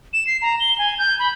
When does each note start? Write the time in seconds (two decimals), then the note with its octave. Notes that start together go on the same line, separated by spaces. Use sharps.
0.13 E7
0.27 C7
0.42 A#5
0.60 G7
0.78 G#5
0.99 G6
1.19 B5